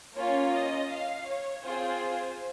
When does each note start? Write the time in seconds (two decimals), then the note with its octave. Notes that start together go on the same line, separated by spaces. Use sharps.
0.15 A#3 C#4 F4 C#5
0.52 D#5
0.90 F5
1.27 C#5
1.64 C4 F4 G#4 C5